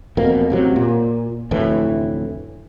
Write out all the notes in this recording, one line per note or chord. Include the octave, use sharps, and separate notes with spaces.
E1 F2 B2 A#3
A1 C3 F#3
A#2
F1 D2 A2 E3